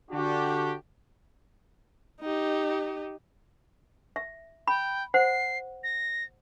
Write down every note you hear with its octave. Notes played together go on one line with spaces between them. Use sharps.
D3 D4 F#4 G4
D#4 G4
E5
G5 B5
C5 F#5 C7
A#6